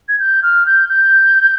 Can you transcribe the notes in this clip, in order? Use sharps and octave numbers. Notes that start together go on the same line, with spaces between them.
G#6
G6
F6
G6
G6